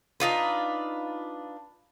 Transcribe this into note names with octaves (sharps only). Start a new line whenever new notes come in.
D4 D#4 F4 B4